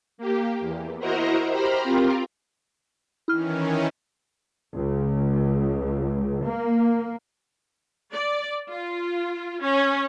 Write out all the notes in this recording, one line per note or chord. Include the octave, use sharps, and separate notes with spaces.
A#3 G4
E2
E4 F#4 A#4 C5 D#5 A#5
G4 C5 A#5 B5 F6
C4 F4 G4 A#4
D#3 E3 C#4 E4 F6
C#2
A#3
D5
F4
C#4